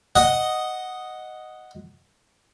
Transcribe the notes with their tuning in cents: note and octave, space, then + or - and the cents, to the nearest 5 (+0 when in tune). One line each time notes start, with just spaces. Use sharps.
D#5 +0 F#5 +0